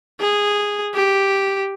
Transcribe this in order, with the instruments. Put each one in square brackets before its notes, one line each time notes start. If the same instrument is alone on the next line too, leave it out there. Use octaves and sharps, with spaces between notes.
[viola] G#4
G4